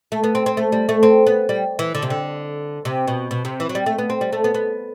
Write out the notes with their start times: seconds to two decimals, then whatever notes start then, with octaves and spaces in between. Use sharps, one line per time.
0.12 A3
0.24 B3
0.35 C4
0.46 C4
0.57 A3
0.72 G3
0.89 A3
1.03 C4
1.26 B3
1.49 G3
1.79 E3
1.95 D3
2.02 C3
2.10 D3
2.85 C3
3.08 B2
3.31 B2
3.45 C3
3.60 E3
3.69 F#3
3.75 G3
3.86 A3
3.98 B3
4.10 C4
4.21 G3
4.32 A3
4.44 B3
4.54 B3